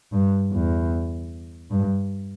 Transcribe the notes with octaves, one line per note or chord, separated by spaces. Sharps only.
G2
E2
G2